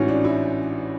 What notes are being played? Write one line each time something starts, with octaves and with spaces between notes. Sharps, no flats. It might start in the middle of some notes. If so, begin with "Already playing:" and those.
Already playing: A1 G#2 E3 C#4 F#4
D4
E4